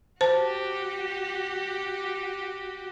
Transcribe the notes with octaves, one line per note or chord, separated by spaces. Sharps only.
F#4 G4 C5 A5